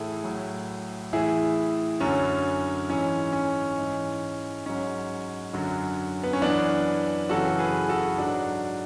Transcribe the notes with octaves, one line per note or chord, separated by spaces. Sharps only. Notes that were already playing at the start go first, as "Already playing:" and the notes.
Already playing: A2 E3 E4 G#4 A4
A2 F#3
A2 E3 E4 G#4
F#2 D3 F#3 C#4
G#2 E3 C#4
C#4
G#2 E3
G#2 F#3 C#4
F#2 D3 F#3
B3
C#4
F#2 E3 B3 D4
F#2 C#3 E3 F#4 A4
G#4 B4
F#4 A4
G#2 F#3 D4 F#4